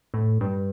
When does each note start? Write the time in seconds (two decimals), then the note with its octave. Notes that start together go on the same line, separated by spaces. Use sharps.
0.14 A2
0.41 G2